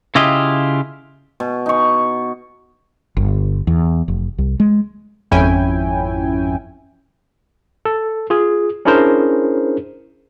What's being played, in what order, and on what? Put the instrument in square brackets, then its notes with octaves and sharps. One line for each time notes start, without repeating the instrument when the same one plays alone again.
[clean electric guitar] C#3 E4 F4 G4 D#5
[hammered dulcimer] B2
D#4 C#6
[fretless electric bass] G1
E2
F1
C2
G#3
[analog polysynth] G#1 F2 C#4 E4 G5 G#5
[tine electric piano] A4
F4 G#4
C#4 D4 E4 G#4 A#4 C5